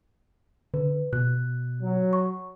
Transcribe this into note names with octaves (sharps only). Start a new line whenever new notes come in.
D3 B4
B2 F#6
F#3
C#6